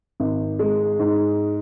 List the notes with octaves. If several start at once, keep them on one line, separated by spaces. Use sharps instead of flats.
G#1
G#3
G#2